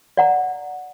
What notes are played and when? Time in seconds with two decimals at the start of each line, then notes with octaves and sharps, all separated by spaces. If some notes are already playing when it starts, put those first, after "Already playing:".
0.17 D5 F#5 A#5